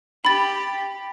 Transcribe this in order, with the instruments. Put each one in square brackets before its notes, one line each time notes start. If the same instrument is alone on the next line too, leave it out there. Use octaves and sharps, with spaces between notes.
[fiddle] G4 [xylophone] B5 A6